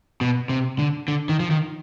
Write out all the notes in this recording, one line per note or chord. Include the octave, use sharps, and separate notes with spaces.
B2
C3
D3
D3
D#3
F3
D#3